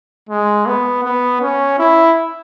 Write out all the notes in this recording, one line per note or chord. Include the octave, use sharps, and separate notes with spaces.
G#3
B3
B3
C#4
E4